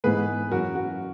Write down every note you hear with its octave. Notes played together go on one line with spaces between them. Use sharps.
G#2 E3 B3 G#4 B4
F#2 E3 A#3 C#4 F#4 A#4
F#4